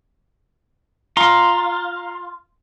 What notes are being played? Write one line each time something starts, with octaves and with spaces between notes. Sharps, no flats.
F4 A#5 C6